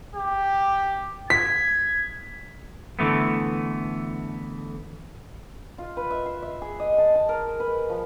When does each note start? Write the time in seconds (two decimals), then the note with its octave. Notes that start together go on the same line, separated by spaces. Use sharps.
0.16 G4
1.30 G#6 B6
2.99 D3 E3 A3 B3
5.78 F4
5.97 B4
6.11 E5
6.26 C6
6.42 E5
6.62 G#4
6.80 D#5
6.98 A5
7.15 A5
7.29 A#4
7.60 B4
7.89 F3